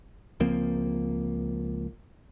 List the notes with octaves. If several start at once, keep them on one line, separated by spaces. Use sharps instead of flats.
C#2 F3 A#3 C4